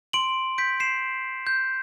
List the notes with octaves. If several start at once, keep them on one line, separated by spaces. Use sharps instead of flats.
C6 D7 F#7
G6 B6 D7
C7 E7
C6
G6